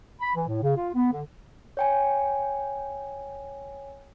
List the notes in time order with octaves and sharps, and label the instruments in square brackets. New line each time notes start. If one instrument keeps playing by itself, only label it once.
[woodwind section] B5
E3
A2
C#3
F4
B3
D3
[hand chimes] C#5 G5 G#5